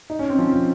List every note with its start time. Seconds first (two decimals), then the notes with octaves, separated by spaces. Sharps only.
0.10 D#4
0.19 C#4
0.30 C4
0.38 F3
0.53 F3